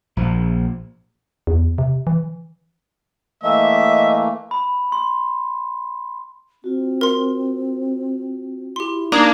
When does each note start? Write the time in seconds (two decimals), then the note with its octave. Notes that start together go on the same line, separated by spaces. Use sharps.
0.17 A#1 F3
1.47 E2
1.78 C3
2.07 E3
3.43 E3 A3 A#3 D#5 E5
4.51 B5
4.92 C6
6.64 C4 F4 F#4
7.01 A#4 C6
8.76 E4 G4 C6
9.12 A#3 D4 D#4 A#5 D#6 G#6